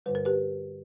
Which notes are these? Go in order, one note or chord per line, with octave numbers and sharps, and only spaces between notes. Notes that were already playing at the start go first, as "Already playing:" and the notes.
G2 D3 G3 B4
A#4
G4 B4